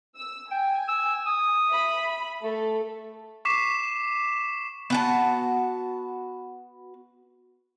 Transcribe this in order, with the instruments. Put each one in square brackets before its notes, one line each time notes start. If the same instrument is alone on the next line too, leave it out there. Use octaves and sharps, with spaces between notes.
[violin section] E6
[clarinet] G5 [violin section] G#5
[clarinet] E6
D#6
[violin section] E5 B5
[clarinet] A3 [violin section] A4
[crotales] C#6 D6 B6 C7 E7
[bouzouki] B3 F#4 A5